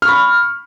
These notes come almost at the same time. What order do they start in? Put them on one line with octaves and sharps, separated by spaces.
F6 C#6 B5